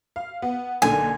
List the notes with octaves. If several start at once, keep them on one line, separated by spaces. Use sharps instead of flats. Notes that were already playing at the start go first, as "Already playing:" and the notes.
F5
B3
B1 A#2 D3 G#5